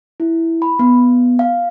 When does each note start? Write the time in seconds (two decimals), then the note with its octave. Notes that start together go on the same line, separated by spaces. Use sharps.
0.20 E4
0.62 B5
0.79 B3
1.39 F5